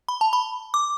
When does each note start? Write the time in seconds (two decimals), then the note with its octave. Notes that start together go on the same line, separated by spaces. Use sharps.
0.08 B5
0.21 A5
0.33 B5
0.74 D6